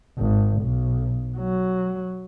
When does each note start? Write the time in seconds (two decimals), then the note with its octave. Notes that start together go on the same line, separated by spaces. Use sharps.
0.18 G#1
0.62 B1
1.38 F#3